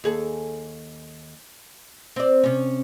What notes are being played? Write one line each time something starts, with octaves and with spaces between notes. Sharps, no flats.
D#2 G#4 A4
C4 D5
C3 C#4